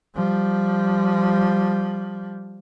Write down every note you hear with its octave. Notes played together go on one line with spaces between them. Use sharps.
F3 G3